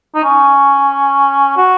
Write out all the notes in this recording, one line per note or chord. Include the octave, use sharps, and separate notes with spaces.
D#4
C#4
F#4